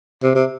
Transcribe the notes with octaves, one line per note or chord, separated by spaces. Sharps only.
C3
C3